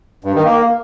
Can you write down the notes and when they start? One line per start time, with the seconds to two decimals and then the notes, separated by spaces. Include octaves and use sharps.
0.24 G2
0.35 D#3
0.45 A#3